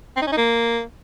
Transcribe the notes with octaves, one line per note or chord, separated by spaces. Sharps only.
C4
D#4
C#4
D#4
A#3